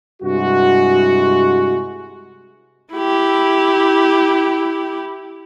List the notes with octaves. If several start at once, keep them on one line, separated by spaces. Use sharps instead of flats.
G2 C3 G#3 E4 F#4
E4 G4